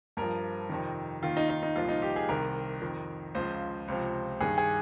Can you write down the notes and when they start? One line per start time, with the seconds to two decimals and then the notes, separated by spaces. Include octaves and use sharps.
0.17 G2 F3 A#4
0.69 F2 C3 D#3
1.23 D#2 D#3 F4
1.37 D#4
1.50 D#4
1.63 D#4
1.76 C2 A#2 F3 F4
1.89 D#4
2.02 G4
2.16 G#4
2.29 C2 C3 D#3 A#4
2.81 F2 D#3
3.35 C#2 C#3 F3 C5
3.88 C#2 C3 F3
4.40 G2 D#3 G#4
4.58 G#4